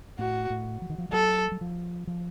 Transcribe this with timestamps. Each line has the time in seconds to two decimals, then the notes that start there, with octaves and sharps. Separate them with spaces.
0.19 A2 F#4
0.50 A2
0.82 F3
0.90 D#3
0.98 F3
1.09 F3
1.13 F#3 A4
1.52 F#3
1.61 F3
2.07 F3